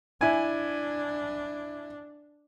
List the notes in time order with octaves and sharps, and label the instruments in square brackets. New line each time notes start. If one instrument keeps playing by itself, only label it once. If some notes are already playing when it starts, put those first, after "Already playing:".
[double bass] D4 [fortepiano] E4 G#5